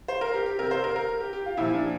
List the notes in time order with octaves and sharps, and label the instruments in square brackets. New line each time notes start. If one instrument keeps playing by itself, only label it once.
[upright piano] C5
A#4
G4
G4
C3 G3 A#4
C5
A#4
A#4
G4
G4
F4
A#2 F3 E4
D4